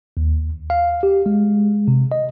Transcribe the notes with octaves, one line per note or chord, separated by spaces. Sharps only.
D#2
F5
G4
G#3
C3
D#5